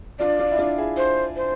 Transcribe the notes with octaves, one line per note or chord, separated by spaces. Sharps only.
D4 F4 D5
D4 F4
E4
D4 F4
E4 G#4
C5
C5